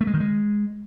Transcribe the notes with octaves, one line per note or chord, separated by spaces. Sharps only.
A3
G#3
D#3
G#3